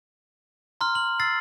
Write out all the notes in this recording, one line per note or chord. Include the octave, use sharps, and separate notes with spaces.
A#5 C6 F6
F#7
E6 A6 C7